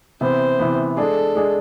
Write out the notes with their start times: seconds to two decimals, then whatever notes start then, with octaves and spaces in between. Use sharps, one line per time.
0.21 C3 E3 B3 C5
0.59 C3 E3 B3
0.97 G#3 D4 G#4 A4
1.35 G#3 D4 G#4